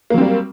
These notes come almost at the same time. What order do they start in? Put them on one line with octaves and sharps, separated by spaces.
A#3 F#3 C4 G3